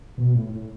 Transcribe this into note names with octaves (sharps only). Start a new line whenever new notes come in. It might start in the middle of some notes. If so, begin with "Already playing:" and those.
B2
A2
A2